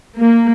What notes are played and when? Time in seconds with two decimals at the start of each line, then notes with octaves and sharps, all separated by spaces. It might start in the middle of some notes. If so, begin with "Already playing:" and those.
0.17 A#3